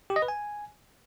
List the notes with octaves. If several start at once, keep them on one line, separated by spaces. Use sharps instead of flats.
G4
D#5
B4
G#5